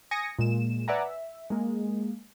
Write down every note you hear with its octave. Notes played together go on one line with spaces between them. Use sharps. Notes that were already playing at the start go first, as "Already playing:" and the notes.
G#5 D#6 A#6 C#7
A#2 G#3 E7
B4 D5 E5 F#5 G#5 A#5
E5
G#3 A#3